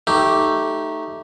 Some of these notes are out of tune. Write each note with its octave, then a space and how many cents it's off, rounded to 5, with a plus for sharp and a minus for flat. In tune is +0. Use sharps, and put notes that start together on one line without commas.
A3 +0 D#4 +0 G4 -15